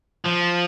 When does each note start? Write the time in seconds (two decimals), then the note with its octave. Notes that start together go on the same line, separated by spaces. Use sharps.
0.25 F3